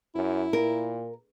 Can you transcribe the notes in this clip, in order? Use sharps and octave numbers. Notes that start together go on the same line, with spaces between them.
F#2 E4
A#2 A#4